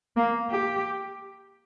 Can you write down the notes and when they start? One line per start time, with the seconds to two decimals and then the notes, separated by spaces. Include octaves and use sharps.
0.16 A#3
0.50 G4